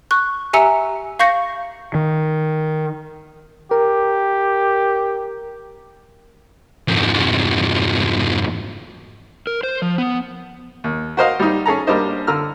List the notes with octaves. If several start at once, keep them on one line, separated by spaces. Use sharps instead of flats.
C#6 F#6
G4 E5 G#5 A#5 E6 C#7
F5 C#6 G6 A#6 C#7
D#3
G4 A#4
F2 G#2
A#4
C5
F3
B3
D#2
F#4 A#4 C5 D#5 F5
G3 D#4
C#4 G#4 A4 A#5
G3 A#3 D4 C5 D#5
D3 A#5 E6 F6